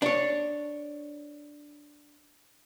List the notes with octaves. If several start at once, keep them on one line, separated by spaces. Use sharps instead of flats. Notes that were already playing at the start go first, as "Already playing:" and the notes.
D4 C#5